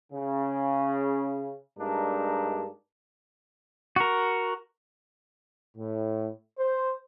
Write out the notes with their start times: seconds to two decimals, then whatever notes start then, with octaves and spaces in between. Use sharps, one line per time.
0.13 C#3
1.78 G2 G#3 A#3 D4 D#4
3.96 F#4 A#4
5.77 A2
6.59 C5